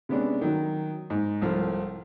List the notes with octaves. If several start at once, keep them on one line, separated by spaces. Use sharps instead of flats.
C3 G#3 B3 C#4 D4
D#3 F#3
G#2
C2 A2 F3